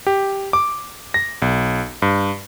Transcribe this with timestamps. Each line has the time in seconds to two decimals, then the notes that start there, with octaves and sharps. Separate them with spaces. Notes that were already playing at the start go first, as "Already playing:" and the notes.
0.07 G4
0.53 D6
1.14 A#6
1.42 B1
2.02 G2